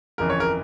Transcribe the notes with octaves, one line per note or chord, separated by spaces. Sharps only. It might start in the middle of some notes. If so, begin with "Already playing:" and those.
G1 F2 C#3 E3 A#4
C#5
A#4